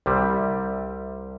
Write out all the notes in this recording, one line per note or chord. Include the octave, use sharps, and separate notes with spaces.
C2 C3 G3